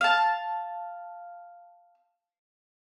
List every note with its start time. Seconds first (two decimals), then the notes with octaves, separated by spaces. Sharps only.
0.01 F5 A5